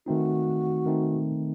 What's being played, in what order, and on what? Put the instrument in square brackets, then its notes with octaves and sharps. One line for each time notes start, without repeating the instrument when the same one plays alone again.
[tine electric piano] D#3 A3 C4 D#4 [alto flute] F#4
[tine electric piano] D#3 A3 C4 D#4